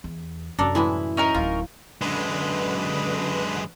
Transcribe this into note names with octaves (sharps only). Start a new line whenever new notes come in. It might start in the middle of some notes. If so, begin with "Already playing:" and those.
E2
F#2 C3 D4 A4 A#4
A2 E3 G#3 E4
C#4 D#4 A#4
D1 F#3 F4
F#2 D3 G#3 B4